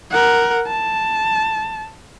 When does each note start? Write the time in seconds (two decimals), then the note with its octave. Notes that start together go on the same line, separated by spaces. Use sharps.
0.11 A#4 F#5
0.67 A5